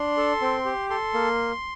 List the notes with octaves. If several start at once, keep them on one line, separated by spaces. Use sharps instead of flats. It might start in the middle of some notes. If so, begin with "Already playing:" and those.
Already playing: D4 C6
A4
C4
G4
A4 C6
A#3